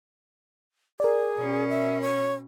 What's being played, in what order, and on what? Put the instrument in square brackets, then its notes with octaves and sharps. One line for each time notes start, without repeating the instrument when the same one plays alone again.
[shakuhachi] G#4 [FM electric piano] A#4 D5
[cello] B2 C#4
[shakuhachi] E5
C#5